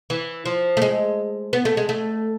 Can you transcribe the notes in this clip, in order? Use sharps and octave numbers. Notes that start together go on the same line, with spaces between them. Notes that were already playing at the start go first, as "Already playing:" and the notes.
E3
F3
A3
G#3
B3
A3
G#3
A3